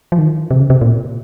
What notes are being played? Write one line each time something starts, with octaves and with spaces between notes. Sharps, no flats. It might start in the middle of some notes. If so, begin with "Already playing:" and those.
F3
D#3
C3
C#3
C3
A#2